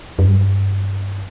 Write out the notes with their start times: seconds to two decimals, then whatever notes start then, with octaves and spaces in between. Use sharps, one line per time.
0.19 F#2
0.25 G2